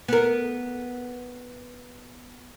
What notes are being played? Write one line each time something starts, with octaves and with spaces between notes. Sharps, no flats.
B3 A#4